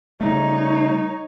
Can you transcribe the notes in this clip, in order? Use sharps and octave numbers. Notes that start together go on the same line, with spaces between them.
C#3 G3 A3 D#4 C#5